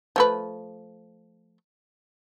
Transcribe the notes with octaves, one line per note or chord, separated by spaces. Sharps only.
F3 A3 B4